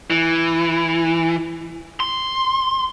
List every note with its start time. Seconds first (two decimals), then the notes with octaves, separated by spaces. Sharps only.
0.10 E3
2.00 C6